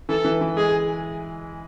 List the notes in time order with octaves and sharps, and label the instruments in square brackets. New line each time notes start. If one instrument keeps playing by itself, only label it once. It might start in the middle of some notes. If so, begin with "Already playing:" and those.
[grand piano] E3 [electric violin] A4
[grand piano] E3
E3
[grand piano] G#3 [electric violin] G#4